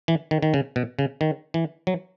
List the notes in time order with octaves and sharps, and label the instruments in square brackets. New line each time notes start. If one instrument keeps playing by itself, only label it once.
[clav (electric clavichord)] E3
D#3
D#3
C#3
B2
C#3
D#3
E3
F#3